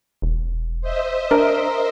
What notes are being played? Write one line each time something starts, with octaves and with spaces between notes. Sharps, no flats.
E1
C5 D#5 E5
D4 A#4